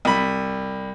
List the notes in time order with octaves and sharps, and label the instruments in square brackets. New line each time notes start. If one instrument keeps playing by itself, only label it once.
[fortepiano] C2 B5